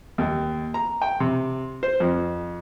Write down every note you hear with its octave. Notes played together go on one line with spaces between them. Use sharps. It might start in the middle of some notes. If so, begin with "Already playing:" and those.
D#2
A#5
G5
C3
C5
F2